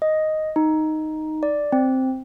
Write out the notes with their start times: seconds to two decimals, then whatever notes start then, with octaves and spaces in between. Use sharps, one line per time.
0.02 D#5
0.56 D#4
1.43 D5
1.72 C4